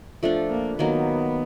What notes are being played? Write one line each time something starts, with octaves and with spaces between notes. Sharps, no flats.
F3 A3 D4
A#3
D#3 F#3 A#3 B3